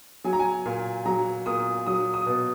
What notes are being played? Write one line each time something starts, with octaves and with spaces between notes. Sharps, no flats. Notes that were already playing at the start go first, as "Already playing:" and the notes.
F#3 G#5
A#5
G#5
A#2
F#3 A#5
A#2 D#6
F#3 D#6
D#6
B2